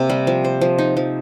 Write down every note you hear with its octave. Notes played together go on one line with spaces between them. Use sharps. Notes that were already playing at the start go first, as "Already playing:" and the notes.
Already playing: C3 A#3 C4
G3
F3
C5
F3
D#4
F3